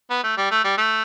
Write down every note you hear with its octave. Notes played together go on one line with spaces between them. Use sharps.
B3
A3
G3
A3
G3
A3